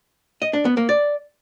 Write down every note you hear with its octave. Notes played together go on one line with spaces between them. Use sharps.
D#5
D4
B3
A#3
D5